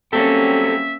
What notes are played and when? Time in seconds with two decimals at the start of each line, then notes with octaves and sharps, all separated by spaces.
0.13 F#3 G3 A#3 C4 C#4 A4 E5